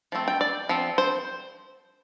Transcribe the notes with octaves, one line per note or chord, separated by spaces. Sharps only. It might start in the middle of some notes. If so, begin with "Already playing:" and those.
F3 A3 C4
G5
D5
F3 C4
C5